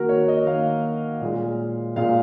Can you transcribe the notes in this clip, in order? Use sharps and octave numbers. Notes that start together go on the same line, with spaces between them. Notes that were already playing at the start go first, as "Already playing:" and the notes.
Already playing: D#3 A#3 F#4 A#4
C#5
D#5
D#3 A#3 F5
A#2 G#3
A#2 G#3 F5